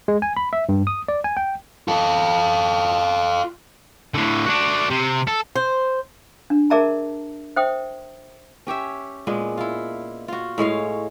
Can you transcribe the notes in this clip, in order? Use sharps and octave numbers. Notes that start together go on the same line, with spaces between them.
G#3
G#5
B5
E5
G2
D#6
D5
G#5
G5
F4 A4
A2 D3
D4 F#4
C3
A4
C5
D4
G#4 A#4 D5 E5 A5 A#5
C5 E5 G5 D#6
C#4 G4 C#5 E5
A#2 G#3 B3
E4 F4
F4 F#4
A2 G#3 C#5 F5